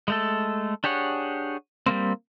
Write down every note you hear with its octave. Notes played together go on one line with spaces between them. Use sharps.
G#3 A3 A4
D4 G4 G#4 C#5 F#5
G3 G#3 A#3 C4